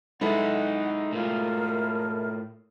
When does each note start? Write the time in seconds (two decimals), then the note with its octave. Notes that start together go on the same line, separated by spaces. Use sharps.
0.21 G#3 D#4 E4 A4 B4 F#5
1.13 A2 F4 A#4